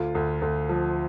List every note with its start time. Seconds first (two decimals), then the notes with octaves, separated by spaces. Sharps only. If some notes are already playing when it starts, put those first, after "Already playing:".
Already playing: D2 F4
0.15 D2
0.42 D2
0.69 F3